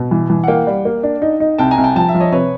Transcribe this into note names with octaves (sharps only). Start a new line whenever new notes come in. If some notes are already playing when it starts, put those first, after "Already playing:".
Already playing: B2
E3
E3
F#5
A#3 F5 G5
G3
A#3
D4
D#4
D#4
C2 G5 A5
G#5 A#5
C2
G5 A5
F3 G5 A5
E5
F3
C#5 D#5
C3 B4 C#5